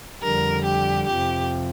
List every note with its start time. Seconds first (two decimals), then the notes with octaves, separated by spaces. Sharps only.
0.22 F2 D3 G3 A#4
0.64 G4
1.06 F2 C3 F3 G4